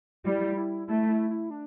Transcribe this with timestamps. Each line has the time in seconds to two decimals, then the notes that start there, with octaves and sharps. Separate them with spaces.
0.25 G3 E4
0.57 E4
0.87 A3 E4
1.09 E4
1.30 E4
1.50 D4